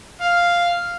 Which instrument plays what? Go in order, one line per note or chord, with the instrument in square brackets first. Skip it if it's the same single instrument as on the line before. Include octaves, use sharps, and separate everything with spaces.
[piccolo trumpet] F5